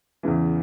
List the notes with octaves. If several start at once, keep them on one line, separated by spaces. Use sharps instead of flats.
E2 C#3 E3